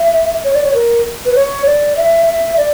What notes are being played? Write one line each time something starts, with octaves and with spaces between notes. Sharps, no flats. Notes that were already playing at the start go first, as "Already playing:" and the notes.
Already playing: E5
C#5
D5
C#5
A#4
B4
C#5
D5
E5
E5
D5